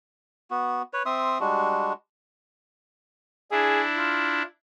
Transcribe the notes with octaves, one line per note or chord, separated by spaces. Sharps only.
B3 F#4
B4 C#5
C4 E5 C6 D#6
G3 G#3 D4 F#4
D4 E4 G#4
F4